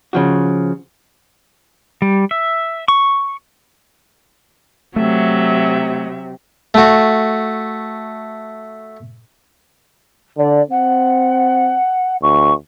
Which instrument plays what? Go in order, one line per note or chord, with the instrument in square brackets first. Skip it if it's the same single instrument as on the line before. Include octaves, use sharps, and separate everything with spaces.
[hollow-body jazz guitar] C#3 F3 F#4
[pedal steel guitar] G3
E5
C#6
[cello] C3 [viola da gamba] F#3 [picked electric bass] A3 [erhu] E5
[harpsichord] A3 F#4
[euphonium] D3 [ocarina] D5
[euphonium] C4 [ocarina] F#5
[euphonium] D2 [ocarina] C#6